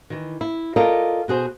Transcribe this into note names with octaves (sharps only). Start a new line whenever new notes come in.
D#3 E3
E4
F4 A4 A#4 D5 D#5
B2 F#4 G#4 C5